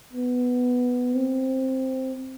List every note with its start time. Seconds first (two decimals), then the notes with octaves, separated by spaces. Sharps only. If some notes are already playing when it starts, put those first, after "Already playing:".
0.13 B3
1.15 C4